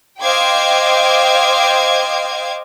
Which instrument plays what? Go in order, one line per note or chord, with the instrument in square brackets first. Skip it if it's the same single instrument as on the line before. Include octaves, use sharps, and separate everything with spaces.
[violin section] C5 D#5 F5 G5 D6 G#6